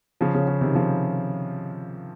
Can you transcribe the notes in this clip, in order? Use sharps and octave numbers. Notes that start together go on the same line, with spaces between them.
C#3 F3
C#3
C#3
C3 D#3
C#3 F3